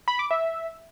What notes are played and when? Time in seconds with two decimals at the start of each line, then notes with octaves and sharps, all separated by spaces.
0.08 B5
0.19 D6
0.31 E5